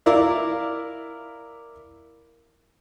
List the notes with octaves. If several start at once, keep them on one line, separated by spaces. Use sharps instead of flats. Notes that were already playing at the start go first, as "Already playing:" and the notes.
E4 A#4 D5 E5 F5